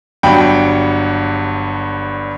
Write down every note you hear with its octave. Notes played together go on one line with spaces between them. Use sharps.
G1 G2 F#3 G5 B5